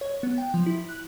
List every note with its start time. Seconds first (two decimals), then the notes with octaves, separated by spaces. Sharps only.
0.01 C#5
0.23 B3
0.38 G5
0.54 F3
0.66 E4
0.88 F#6